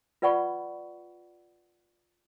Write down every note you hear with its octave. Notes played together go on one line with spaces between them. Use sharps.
F4 B4 D5 F#5 B5 C#6